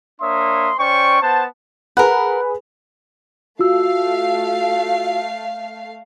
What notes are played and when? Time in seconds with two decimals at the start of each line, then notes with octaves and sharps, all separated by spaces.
0.21 A#3 D4 C#5 E5 C6 D#6
0.79 C#4 C5 D5 G5 C#6
1.22 B3 C5 F#5 A5
1.97 G#4 A#4 B4 F#5
3.59 A3 F4 F#4 F5 E6